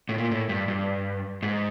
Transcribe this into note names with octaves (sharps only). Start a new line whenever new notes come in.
A2
A#2
A2
G2
G2
G#2